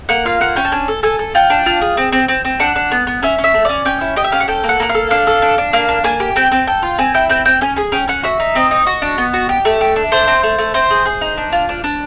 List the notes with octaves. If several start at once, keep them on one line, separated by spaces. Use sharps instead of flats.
A#3 F#5
F4 F5
A#3 F#5
C#4 G5
A5
D4 G#5
A4
A4 G#5
A4
F4 G5
D4
F4
G#4
C4
C4
C4
C4
D4 F#5
D4
B3
B3
C#4 E5
C#4
E5
A3
C#4 D5
C#4 G5
E4
G4 D#5
E5
C#4 F5
F#5
A4 G5
A#3
F#5
A#3 F#5
F5
A4
D4 F5
A4
D4
D4
A#3 F5
D4
A#3 G#5
G4
C4 G5
C4
A4 G5
F4
C4 G#5
E4 G5
C4 G5
C4 G5
C#4 G#5
G#4 G#5
C#4 G5
C#4 F#5
F#4 E5
D#4
C4 D#5
D#4
F#4
D4
B3
F#4
G4
A3
G4
D4
A3 C5
C4
A3
A3
C4 C5
G#4
G#4
D#4
D4
F4
D4
D4